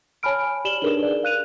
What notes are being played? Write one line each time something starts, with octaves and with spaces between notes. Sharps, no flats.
C#5 G#5 A5 B5 F6 D7
G4 D5 E7 F#7 G7
D4 D#4 G#4 A#4 B4 D5
D5
F5 F#6 D#7 F7